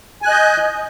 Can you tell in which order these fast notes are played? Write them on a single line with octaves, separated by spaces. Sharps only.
G#5 F#6 D#5 G6